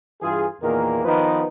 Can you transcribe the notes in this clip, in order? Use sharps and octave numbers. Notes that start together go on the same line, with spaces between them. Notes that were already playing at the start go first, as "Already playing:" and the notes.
G2 E3 F4 G#4
E2 A#2 D#3 A#3 G#4 A#4
D#3 F3 B3 D#4 B4